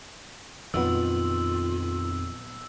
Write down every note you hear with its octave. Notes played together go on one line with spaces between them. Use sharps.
F2 A#2 D#3 F#3 B3 F4 E6